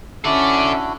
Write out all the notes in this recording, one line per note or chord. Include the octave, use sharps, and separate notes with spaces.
C#4 D4 E4 F#4 A4 D5 E5